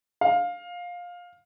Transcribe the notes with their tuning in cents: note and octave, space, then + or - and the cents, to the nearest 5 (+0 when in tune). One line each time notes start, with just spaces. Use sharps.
F5 +15